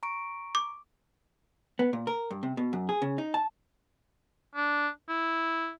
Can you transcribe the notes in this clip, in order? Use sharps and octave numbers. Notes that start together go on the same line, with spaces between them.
A#5 C#6 D7
D6
B3
A#2
A#4
G2
C3
B2
F#2
G#4
C#3
D#4
A5
D4
E4